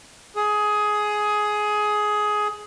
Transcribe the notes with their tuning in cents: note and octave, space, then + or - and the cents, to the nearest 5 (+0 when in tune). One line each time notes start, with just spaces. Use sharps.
G#4 +15 D#6 +15